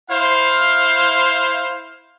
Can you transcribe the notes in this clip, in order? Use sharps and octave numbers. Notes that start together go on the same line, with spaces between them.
E4 C5 F5